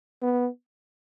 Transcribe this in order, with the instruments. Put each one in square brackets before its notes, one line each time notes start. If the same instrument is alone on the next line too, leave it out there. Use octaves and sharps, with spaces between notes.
[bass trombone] B3